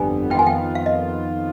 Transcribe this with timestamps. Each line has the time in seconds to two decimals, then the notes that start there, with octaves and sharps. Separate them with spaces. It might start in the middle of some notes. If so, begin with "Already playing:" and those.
Already playing: G1 F2 D3 G3 B3 G#5
0.30 F2 D#3 B3 F4 G5
0.39 G#5
0.47 G5
0.75 F5
0.86 D#5